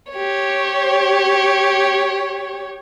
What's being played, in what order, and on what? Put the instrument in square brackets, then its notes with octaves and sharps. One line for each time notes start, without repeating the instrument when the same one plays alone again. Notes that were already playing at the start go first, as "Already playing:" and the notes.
[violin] G4 C#5